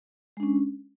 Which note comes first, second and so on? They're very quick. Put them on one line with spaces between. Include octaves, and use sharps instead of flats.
G#3 D4 C#4